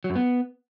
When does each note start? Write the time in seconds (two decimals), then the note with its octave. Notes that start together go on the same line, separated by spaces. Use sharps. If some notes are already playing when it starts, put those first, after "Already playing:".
0.04 F#3
0.10 F#2
0.15 B3